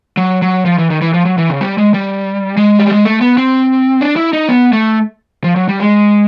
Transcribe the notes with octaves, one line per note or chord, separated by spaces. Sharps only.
F#3
F#3
F3
E3
D#3
E3
F3
F#3
E3
C#3
G3
G#3
G3
G#3
G3
G#3
A3
B3
C4
D4
E4
D#4
B3
A3
F3
F#3
G3
G#3